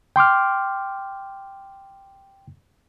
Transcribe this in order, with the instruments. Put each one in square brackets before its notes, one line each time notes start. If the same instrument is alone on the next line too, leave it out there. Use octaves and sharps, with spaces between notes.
[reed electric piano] G5 C6 D6 F6